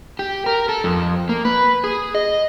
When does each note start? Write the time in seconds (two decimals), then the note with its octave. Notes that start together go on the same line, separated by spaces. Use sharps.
0.19 G4
0.46 A#4
0.69 A4
0.84 F2
1.29 A#3
1.45 B4
1.84 G#4
2.15 D#5